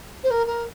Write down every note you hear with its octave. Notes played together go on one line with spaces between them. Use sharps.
C5
A#4
A#4